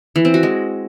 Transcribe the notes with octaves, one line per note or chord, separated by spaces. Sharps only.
E3
C4
F#4
G#3